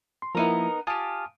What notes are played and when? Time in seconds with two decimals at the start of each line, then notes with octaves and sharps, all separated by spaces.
0.22 C6
0.35 F3 A#3 B3 D#4 E4 A#4
0.87 F4 G4 G#5 A5 D#6